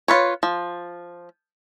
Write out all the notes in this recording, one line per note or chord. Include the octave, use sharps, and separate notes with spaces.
F4 B4 C#5
F3